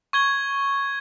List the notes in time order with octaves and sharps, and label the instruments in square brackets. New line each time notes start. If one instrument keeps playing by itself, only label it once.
[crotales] C#6 G#6 G7